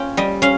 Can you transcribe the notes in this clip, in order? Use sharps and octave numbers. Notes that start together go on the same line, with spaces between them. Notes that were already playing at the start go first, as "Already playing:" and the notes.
Already playing: C#4 F4 G5
G3 D#5
C#4 F5